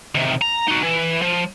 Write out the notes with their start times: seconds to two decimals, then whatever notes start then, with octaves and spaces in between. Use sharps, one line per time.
0.15 C3 D#3
0.41 A#5
0.68 D#4 F#4
0.83 E3
1.22 F3